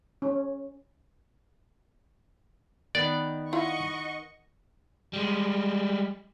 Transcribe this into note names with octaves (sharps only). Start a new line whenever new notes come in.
C#4
D#3 B3 D5
E4 F4 D#5 F#5 C#6
G3 G#3